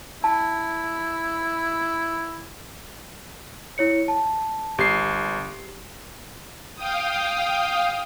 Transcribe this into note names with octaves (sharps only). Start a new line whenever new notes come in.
E4 A5
E4 C#5 C#7
A5
G1 G4 C7
F5 G5 D#6